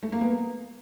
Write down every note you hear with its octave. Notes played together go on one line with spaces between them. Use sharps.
A3
A#3
B3